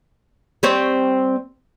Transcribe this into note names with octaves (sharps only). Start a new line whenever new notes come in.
G3 C4 C#5